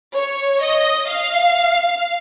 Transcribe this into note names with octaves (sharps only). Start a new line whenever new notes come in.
C#5
D#5
F5